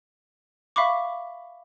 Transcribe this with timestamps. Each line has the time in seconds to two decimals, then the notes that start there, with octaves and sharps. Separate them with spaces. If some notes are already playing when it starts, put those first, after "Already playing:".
0.76 E5 F5 B5 C#6 D6